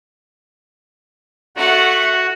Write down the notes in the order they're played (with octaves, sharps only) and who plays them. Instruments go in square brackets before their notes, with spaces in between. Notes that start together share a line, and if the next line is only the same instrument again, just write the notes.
[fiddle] A3 F#5 [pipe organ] F#4